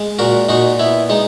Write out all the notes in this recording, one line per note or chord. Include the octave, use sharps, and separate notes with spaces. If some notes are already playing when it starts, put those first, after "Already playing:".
Already playing: G#3
A#2 F#4 A#4
A#2 D#4 F#4
B3 E4
G#3 D#4